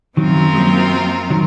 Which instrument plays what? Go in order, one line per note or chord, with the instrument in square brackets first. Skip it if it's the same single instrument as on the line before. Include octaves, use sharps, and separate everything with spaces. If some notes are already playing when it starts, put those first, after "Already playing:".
[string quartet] F#2 F3 C4 F4 A#4 [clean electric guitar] D#3 F#3
[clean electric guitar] G#3
F#3 A#3
D#3 F#3